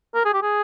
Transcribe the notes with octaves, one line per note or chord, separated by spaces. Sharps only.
A#4
G#4
G4
G#4